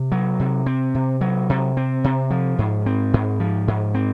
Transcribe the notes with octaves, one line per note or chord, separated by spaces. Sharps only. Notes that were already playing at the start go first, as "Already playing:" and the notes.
Already playing: C3
F#3
C3
C4
C3
F#3
C3
C4
C3
F3
G#2
C4
G#2
F3
G#2
C4